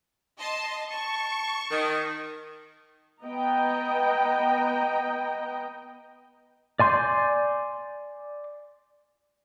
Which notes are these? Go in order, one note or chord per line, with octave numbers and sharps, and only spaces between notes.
D#5 A5 C6
A5 C#6
D#3
B3 D#5 G5 A#5
D5 G#5 C6 G6